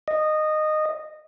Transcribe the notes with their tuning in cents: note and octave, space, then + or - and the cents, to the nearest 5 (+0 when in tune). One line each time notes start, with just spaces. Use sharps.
D#5 -15